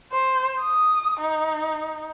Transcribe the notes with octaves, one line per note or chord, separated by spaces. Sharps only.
C5
D#6
D#4